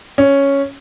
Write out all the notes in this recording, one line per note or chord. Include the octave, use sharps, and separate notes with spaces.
C#4